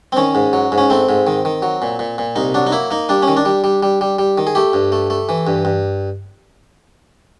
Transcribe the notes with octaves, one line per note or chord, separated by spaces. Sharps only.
C4
D#3 C#4
G#2
F#3
G#2
C#4
A3 C4
G#2
D#3
D#3
F#3
A#2
A#2
A#2
C2 D#4
F#3 D4
D#4
A#3 E4
A#3 D#4
G3 D4
C#4
D#3
D4
G3
G3
G3
G3
G3
D#3
G#4
A3 G4
G2
A3
A3
E3
G2
G2